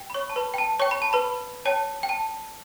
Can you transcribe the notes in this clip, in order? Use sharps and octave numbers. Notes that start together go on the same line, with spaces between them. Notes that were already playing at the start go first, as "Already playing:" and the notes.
Already playing: G5
B5
C#5 C#6
A5
B4 B5
G5
A5
C#5 G5 C#6
B5
A5
B4 B5
C#5 G5 A5
G5
A5